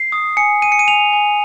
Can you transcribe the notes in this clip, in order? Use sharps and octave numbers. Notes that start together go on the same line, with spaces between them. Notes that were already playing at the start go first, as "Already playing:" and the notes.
Already playing: C7
D#6
G#5 C#7
G#5 D#7
C#7
D#7
G#5 F7
G#5